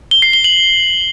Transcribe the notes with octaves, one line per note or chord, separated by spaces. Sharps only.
G7
C7
G7
F#7